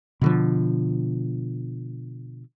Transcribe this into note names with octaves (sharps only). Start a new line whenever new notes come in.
B2 D3 F3